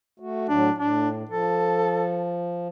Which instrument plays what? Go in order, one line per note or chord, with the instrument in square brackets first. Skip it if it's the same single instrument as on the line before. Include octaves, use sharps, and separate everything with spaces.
[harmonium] A3 F#4
[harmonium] A2 F#3 [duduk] D4
[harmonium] A2 [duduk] D4
[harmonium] F3 [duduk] A4